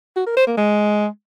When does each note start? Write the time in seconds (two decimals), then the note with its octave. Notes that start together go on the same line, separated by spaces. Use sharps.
0.16 F#4
0.27 A#4
0.37 C5
0.47 A#3
0.57 G#3